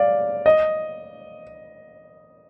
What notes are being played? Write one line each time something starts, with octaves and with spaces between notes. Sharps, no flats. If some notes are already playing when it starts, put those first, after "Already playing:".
Already playing: D5 F5
D#5